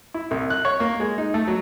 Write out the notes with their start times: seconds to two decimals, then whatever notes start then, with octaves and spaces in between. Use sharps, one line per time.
0.14 E4
0.31 C2
0.50 F#6
0.65 C#5
0.80 A#3
1.00 G#3
1.18 D#4
1.34 A3
1.48 F#3